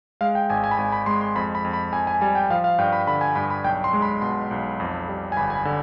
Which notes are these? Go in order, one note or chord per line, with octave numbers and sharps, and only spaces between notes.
G#3 F5
G5
G#1 G#5
G#5
B5
G#1 G#5
B5
G#3 C6
C6
F2 B5
B5
F2
B5
F2 G#5
G#5
G3 G#5
G5
F3 F5
F5
G2 G5
B5
D3 B5
G#5
G2 B5
B5
B1 G5
C6
G#3
B5
B2 C6
B1
F2
G3
G#5
G1 B5
G#5
B5
D3